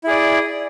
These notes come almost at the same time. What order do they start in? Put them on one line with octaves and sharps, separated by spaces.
E4 G#4 D5